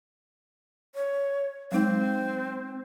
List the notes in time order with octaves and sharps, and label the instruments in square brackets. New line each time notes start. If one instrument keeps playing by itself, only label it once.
[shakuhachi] C#5
[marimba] F#3 G#3 D#4 [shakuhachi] C4